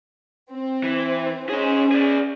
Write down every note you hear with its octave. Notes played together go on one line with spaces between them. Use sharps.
C4
E3
C#4 G#4 C5
G#4 D5